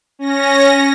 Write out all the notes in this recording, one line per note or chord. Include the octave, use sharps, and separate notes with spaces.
C#4 A#6